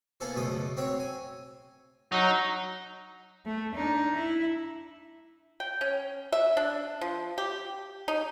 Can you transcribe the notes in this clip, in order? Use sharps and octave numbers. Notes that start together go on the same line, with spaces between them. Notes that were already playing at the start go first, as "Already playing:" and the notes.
A#3 B3 E4 G#4 A4 C5
C#2 F#2 B2 A3 D#6
C4 F#4 C#5 E5 F#5
G#5
F#3 D#4
A3
D4 D#4
E4
G5
C#4
E5
D4
F3
G4
D#4